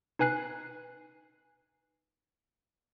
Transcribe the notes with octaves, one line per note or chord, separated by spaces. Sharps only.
D#4 B4 G#5 F#6 C7